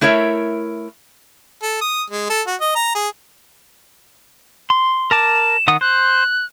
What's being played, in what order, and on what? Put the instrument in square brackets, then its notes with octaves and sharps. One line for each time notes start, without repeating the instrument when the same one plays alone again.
[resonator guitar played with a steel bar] A3 E4 A#4 C#5 E5
[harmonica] A4
D#6
G#3
A4
F#4
D#5
A#5
G#4
[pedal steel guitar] C6
[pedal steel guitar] A#4 A5 D6 [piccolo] E7
[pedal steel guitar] D#3 F#5 D#6
[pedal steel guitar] C5 [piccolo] F#6